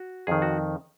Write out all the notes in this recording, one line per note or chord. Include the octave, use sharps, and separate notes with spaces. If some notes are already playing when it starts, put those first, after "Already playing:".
Already playing: F#4
F2 D#3 G#4
F#4